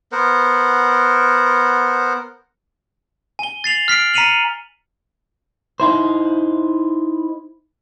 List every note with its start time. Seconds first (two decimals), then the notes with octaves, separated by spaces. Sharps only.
0.12 B3 A#4 C5 F#5
3.39 G#5 G7
3.64 A6 C7 F7 F#7
3.88 F6 B6 C7 D7
4.14 A#5 B6 C#7 D#7 F7 F#7
5.80 D#4 E4 C5